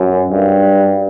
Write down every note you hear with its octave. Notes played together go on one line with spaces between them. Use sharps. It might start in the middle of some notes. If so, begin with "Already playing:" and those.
Already playing: F#2
G2